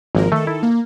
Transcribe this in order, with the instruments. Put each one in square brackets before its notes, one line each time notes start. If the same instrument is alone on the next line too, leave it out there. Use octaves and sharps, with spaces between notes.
[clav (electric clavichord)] G#1 [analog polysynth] F3 A#3 A#4
[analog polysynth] D#3 A4 [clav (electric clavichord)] A3
[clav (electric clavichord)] E4
[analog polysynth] A#3